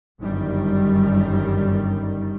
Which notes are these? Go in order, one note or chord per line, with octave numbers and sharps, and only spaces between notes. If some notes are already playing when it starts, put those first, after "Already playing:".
G1 F#2 D#3 G3